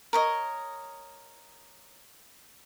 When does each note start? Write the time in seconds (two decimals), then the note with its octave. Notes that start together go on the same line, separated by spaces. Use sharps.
0.13 A#4 C#5 D#5